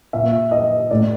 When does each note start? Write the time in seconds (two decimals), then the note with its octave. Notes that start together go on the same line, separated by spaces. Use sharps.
0.13 A#2 E5
0.51 D#5
0.91 A2 D5